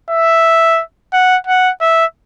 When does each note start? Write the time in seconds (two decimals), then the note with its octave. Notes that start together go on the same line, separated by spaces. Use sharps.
0.10 E5
1.13 F#5
1.47 F#5
1.81 E5